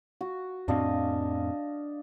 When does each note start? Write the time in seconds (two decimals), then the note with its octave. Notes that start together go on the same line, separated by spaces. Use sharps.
0.21 F#4
0.68 F2 A2 C4 D4 D#5 F5